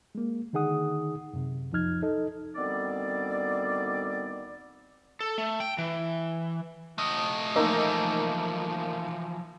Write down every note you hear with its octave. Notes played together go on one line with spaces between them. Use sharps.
G#3 A#3
D3 D#3 D#4 G#4 F#5 D#6
F#2 C3
C2 F2 F3 D#4 F6 G#6
D#4 A4 D#5
D2 D#3 G3 B3 C4 D5
A4
A3
G5
E3
A3 D#5
E3 F3 A3 A#3 D#4